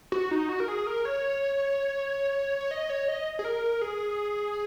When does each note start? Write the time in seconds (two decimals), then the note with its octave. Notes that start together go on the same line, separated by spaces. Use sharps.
0.12 F#4
0.31 D#4
0.49 F#4
0.60 A#4
0.68 G#4
0.87 A#4
1.05 C#5
2.61 C#5
2.71 D#5
2.90 C#5
3.08 D#5
3.39 G#4
3.45 A#4
3.82 G#4